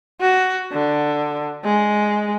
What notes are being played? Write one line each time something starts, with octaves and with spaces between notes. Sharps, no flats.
F#4
D3
G#3